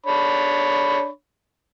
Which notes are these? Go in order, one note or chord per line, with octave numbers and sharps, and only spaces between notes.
D4 C#5 B5